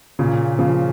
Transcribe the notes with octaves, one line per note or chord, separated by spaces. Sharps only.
A#2 C#3
C#3 F3